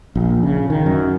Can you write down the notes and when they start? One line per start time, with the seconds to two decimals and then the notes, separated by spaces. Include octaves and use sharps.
0.16 A#1
0.43 C#3
0.70 D#3
0.86 F#2